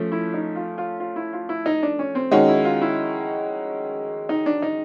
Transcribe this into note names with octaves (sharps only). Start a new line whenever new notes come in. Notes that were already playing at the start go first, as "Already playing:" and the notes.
Already playing: F3 A3 C#4
E4
D#4
F4
F4
F4
E4
F4
E4
D#4
D4
C#4
C4
D#3 G#3 C#4 D#4 F#4
E4
F4
E4
D#4
D4
D#4